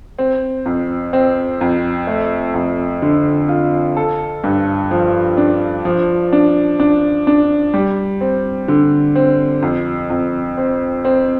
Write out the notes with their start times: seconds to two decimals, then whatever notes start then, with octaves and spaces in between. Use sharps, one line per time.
0.19 C4
0.66 F2
1.13 C4
1.61 F2
2.07 A3
2.54 F2
3.02 D3
3.49 F4
3.97 A4
4.44 G2
4.91 F3
5.37 D4
5.85 F3
6.32 D4
6.80 D4
7.27 D4
7.74 G3
8.21 C4
8.68 D3
9.15 C4
9.62 F2
10.10 F2
10.57 C4
11.05 C4